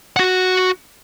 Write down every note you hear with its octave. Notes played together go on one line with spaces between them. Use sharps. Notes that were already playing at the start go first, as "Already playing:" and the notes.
F#4 F#5